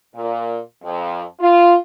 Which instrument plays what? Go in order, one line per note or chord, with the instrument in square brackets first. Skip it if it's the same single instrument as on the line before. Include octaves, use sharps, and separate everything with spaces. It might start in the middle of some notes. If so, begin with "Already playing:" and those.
[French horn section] A#2
F2
F4